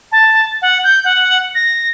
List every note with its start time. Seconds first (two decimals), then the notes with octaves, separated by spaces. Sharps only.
0.12 A5
0.62 F#5
0.84 G6
1.05 F#5
1.55 A#6